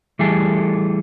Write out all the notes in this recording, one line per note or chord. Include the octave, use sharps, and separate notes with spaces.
E3 G3 A3 G#4 A4